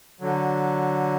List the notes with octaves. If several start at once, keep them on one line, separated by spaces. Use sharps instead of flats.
D3 F#3